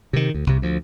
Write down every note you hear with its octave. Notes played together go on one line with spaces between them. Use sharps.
C3 D#3
D2
C2 C3
D2 F3